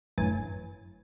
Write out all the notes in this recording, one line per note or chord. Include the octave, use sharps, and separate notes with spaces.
G1 F#2 A2 E3 G#5 A6